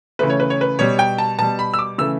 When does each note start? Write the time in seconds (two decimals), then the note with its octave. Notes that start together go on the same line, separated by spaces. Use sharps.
0.19 C#3 E3 A3 B4
0.30 C#5
0.40 B4
0.50 C#5
0.61 B4
0.79 B2 G3 C#5
0.99 G5
1.18 A5
1.38 B2 G3 A5
1.59 B5
1.74 E6
1.79 D6
1.98 C#3 E3 A3 E6